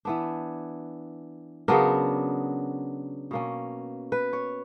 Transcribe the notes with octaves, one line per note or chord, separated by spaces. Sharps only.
E3 B3 D4
C#3 F#3 B3 D4 A#4
B2 A#3 C#4
B4
C#5